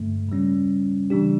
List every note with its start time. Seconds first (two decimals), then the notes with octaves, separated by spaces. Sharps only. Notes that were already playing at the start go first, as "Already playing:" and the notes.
Already playing: G2 D3 A3
0.29 C#3 G3 C#4
1.10 C#3 E3 G3 D4 G4